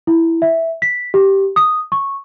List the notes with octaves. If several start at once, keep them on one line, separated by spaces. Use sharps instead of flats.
E4
E5
B6
G4
D#6
C#6